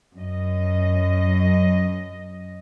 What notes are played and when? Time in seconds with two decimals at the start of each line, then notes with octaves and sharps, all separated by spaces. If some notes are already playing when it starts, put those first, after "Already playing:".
0.16 F#2 D#5